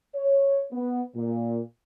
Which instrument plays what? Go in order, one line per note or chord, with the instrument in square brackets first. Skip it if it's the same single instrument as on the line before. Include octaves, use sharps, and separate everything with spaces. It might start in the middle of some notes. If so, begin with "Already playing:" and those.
[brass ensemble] C#5
B3
A#2